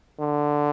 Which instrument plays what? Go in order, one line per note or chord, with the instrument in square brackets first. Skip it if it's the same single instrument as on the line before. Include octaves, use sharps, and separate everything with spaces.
[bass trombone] D3